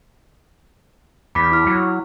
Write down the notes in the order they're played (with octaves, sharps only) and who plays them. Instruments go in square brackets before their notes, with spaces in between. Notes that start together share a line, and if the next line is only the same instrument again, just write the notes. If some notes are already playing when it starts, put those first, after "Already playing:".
[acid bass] E2 [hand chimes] B5 D6 B6
[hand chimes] E4 F6
[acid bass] F#3